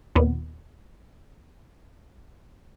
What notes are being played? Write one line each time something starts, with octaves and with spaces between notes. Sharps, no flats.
D#2 A#2 B3